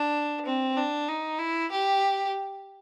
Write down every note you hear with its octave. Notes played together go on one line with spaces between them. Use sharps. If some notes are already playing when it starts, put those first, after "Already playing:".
Already playing: D4
C4
D4
D#4
E4
G4